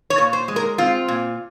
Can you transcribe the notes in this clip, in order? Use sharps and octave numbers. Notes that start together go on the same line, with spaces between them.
C#5
A#2
C5
G#3
A#4
C4 F4
A#2